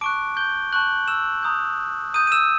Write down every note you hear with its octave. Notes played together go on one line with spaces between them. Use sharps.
A5 C#6 D6 F#6 D7
G6 G7
A5 C#6 F#6 F#7
E6 E7
A#5 D#6 G6
A#5 D#6 G6 D#7
D#7
E6 E7